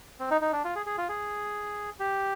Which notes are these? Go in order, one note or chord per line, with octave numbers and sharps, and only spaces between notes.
C4
D#4
D#4
D4
F4
G#4
G#4
F4
G#4
G4